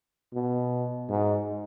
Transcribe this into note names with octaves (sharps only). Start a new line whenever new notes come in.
B2
G#2